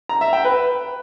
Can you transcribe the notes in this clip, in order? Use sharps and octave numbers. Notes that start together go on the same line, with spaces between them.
A#5
E5
G5
B4